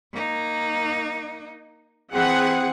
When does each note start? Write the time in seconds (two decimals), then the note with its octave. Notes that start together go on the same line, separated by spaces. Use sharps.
0.13 A#3 D#4
2.13 E3 C4 G#4 F#5